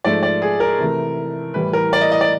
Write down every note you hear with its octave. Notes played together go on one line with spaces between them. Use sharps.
G#2 F3 A3 D5
D5
G#4
A#4
C3 E3 A3
A2 E3 G3 B4
A#4
D5
D#5
D#5
D5